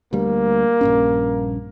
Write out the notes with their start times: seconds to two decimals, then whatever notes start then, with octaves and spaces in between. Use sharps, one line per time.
0.13 D2 G3 A#3
0.81 A#1 G2 C#4